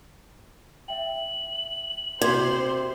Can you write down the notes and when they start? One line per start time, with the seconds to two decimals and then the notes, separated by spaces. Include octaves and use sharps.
0.88 E5 G5 F#7
2.21 C3 F#4 C5 C6